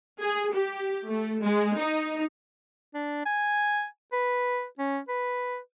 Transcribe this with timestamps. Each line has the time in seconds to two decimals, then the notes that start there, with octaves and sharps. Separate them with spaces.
0.21 G#4
0.53 G4
1.08 A3
1.42 G#3
1.77 D#4
2.94 D4
3.26 G#5
4.13 B4
4.79 C#4
5.08 B4